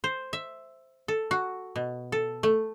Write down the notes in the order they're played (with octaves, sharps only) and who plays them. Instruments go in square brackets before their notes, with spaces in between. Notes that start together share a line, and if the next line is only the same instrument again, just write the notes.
[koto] C5
E5
A4
F#4
B2
A4
A3